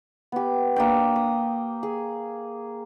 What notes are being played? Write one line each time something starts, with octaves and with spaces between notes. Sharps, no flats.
B3 G4
A#3 D4 G5
D#6
G#4